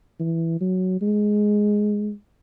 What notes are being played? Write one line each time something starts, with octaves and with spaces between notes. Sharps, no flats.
E3
F#3
G#3